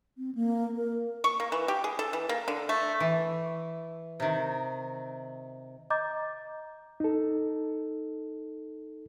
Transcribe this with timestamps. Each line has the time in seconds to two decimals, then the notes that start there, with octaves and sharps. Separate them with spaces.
0.18 C4
0.35 A#3
0.76 A#4
1.24 C#6
1.40 A#3
1.52 E3
1.68 G4
1.84 G#4
1.99 A4
2.13 E3
2.29 A#3
2.48 D3
2.69 A3
3.00 E3
4.20 C3 D#3
5.90 D#5 A#5 D6 G6 A6
7.00 D#4 A4